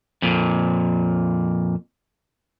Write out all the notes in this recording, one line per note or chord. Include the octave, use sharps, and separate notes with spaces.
F2 A#2